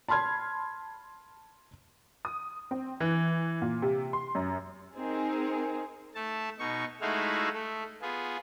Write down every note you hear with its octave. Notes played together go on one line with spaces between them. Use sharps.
A5 B5 C6 F6 G#6
D#6
C4
E3
A#2
C3
C6
F#2
C4 D#4 G#4 A#4
A3 A5
B2 D#4 C#6
G#3 A3 D#4 E4 F#4 F5
A3
B3 F4 G#4